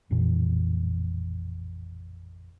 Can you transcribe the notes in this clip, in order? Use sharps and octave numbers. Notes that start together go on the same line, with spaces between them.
A1 F2 A#2 E3